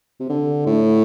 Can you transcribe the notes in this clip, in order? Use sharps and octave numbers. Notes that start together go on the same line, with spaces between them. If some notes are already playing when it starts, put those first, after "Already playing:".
C3
D3
A2